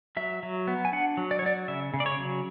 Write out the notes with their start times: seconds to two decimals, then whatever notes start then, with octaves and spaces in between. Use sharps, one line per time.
0.17 F#3 E5
0.43 F#3
0.68 B3
0.85 G#5
0.93 D4 F#5
1.17 F#3
1.31 D5
1.39 C#5
1.42 F#3 D5
1.68 C#3 E5
1.94 C#3
2.00 D5
2.06 C#5
2.18 F#3